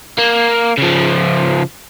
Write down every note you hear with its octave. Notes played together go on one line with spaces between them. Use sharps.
A#3
C#3 F3